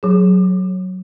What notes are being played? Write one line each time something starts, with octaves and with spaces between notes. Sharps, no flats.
F#3 G#4